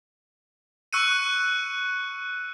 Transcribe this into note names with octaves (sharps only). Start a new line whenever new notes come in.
C#6 E6 F#6 C#7 D#7